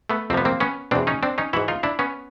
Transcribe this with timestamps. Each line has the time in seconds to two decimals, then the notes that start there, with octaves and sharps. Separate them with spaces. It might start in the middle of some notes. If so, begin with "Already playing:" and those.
0.10 A3 B3
0.30 F2 C4
0.33 C3 F3 B3
0.45 A#3 C4
0.60 B3 C#4
0.91 E2 B2 C4 D4
1.07 C#4 D#4
1.23 C4 D4
1.38 C#4 D#4
1.53 G#2 E3 E4 F#4
1.68 D#4 F4
1.83 D4 E4
1.99 B3 C#4